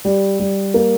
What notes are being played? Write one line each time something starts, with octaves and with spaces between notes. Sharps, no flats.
G3
G3
A#3